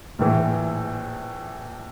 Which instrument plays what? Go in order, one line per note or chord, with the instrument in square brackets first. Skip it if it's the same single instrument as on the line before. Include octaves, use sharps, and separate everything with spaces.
[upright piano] A#1 A2 E3